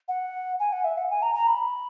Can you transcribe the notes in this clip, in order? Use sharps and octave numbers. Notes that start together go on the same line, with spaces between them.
F#5
G#5
F#5
E5
F#5
G#5
A#5
A#5
B5